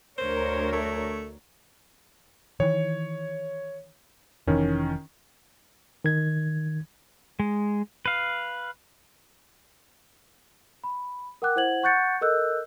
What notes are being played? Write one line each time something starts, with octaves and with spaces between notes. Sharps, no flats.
D2 A#4 C5 C#5
A3
D#3 E3 C#5
F1 D#3 E3 C#4
D#3 G#6
G#3
B4 F5
B5
A#4 F#5 G5 D6 F#6
E4 C5 F#5 G#6 F#7
F#5 C#6 F#6 G6 A6 C#7
A4 A#4 D#5 E6 F#6 G6